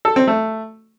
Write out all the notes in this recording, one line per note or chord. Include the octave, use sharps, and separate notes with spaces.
A4
C4
A3